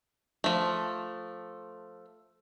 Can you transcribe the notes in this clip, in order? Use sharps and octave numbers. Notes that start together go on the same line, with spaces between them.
F3 A3